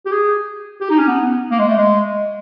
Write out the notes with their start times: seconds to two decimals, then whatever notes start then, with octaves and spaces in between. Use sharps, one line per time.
0.06 G4
0.11 G#4
0.81 G4
0.90 D#4
0.99 C#4
1.07 B3
1.51 A#3
1.59 G#3
1.68 A3
1.77 G#3